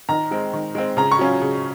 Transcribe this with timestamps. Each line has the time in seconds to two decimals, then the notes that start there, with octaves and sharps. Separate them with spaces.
0.09 D#3 A#5
0.31 G#3 C4
0.53 D#3
0.75 G#3 C4
0.97 C#3 A#5
1.12 C#6
1.19 F#3 C#4 F4
1.42 C#3